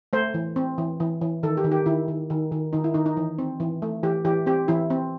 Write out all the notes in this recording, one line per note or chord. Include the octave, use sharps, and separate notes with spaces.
A3 C5
E3
C4
E3
E3
E3
D#3 A4
G4
D#3
G4
D#3 E4
D#3
D#3
D#3
D#3 D#4
E4
D#3 D#4
D#4
E3
C4
E3
A3
E3 G4
E3 G4
C4 G4
E3 E4
C4